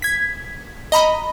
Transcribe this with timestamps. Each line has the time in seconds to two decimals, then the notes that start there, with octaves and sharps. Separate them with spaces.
0.02 G#6 B6
0.92 D#5 A#5 B5